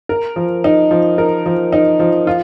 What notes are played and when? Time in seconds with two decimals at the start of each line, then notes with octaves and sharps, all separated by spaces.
0.09 A#4
0.36 F3
0.64 D#4
0.91 F3
1.18 A#4
1.46 F3
1.73 D#4
2.00 F3
2.27 F4